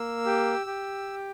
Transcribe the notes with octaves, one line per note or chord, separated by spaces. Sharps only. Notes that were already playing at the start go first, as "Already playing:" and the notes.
Already playing: A#3 E6
G4
G4